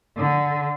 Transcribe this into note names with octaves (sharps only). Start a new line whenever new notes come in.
D3